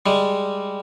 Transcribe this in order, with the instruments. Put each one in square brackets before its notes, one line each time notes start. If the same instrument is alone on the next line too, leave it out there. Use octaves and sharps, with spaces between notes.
[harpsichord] G3 G#3